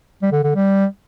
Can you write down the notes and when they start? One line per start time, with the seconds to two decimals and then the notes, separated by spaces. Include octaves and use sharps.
0.23 G3
0.32 D3
0.44 D3
0.55 G3